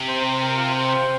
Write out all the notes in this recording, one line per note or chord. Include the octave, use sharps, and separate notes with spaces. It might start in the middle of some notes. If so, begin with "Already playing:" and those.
Already playing: C3
C5
C5
A#4
F4
C5